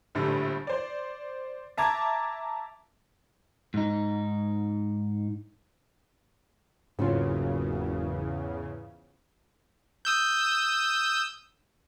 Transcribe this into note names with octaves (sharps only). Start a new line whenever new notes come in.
A#1 A2 D3 G3
C5 D5
E5 A5 A#5 D6 G#6
G#2 D#4
F#1 E2 G#2 C#3 C4 C#4 F4
D#6 E6 G6